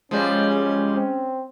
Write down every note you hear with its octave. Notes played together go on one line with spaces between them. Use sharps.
F3 G3 G#3 C#4
C4